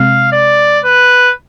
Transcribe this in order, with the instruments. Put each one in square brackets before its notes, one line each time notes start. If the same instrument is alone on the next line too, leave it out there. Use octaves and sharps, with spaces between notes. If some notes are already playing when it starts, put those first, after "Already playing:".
Already playing: [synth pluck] C3 G#3 C4 [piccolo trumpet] F5
[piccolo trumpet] D5
B4